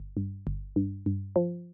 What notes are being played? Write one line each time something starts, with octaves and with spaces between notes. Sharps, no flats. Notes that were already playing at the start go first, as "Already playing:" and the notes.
Already playing: G1
G2
G1
G2
G2
F3